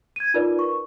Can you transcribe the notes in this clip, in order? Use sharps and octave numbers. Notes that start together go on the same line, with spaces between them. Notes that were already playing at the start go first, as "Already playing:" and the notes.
G#6 D#7
D#4 F4 A#4 B4 D5
C#6